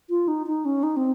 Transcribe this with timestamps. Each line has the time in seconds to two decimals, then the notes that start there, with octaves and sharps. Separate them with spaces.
0.10 F4
0.28 D#4
0.47 D#4
0.65 C#4
0.83 D#4
0.97 C4